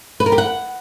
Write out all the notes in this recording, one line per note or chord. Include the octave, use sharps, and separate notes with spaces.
B4
A#4
G4
F#5